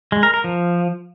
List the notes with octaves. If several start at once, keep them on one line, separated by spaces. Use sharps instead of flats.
G#3
A#4
A#4
F3